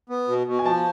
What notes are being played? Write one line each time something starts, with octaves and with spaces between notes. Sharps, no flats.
B3
B2
B2
G#5
F3 A5